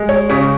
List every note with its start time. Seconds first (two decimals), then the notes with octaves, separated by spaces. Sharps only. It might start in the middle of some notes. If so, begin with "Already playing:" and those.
Already playing: G#3
0.09 C#5
0.29 C#3 C#5